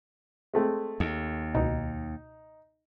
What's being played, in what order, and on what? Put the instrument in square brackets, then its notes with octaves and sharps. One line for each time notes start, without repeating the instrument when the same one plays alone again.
[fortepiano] G#3 A3 C4
[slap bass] D#2
[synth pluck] C#2 B2 [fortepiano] D#4